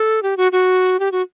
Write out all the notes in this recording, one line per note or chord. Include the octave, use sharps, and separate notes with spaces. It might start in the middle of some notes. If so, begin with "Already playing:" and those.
Already playing: A4
G4
F#4
F#4
G4
F#4